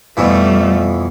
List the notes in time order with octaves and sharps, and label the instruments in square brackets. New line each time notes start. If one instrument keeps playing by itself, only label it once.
[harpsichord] F2 B2 E3 [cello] G3 A3